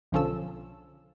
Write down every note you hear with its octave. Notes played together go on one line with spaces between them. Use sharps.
B1 D3 F3 C#4 A4 E6